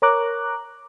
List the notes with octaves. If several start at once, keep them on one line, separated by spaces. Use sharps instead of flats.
A#4 C#5 A#5 D6 F#6